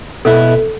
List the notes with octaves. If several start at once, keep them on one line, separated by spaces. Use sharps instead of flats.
B2 B3 E4 A4